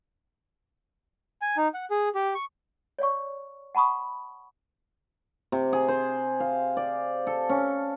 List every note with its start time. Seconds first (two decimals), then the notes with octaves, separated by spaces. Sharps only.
1.42 G#5
1.57 D#4
1.74 F#5
1.90 G#4
2.15 G4
2.35 C#6
2.99 C#5 D5 F5 C#6
3.75 F#5 A5 B5 C#6 D#6
5.52 C3
5.73 G#4
5.88 C5
6.40 F5
6.77 D5
7.27 A4
7.50 C#4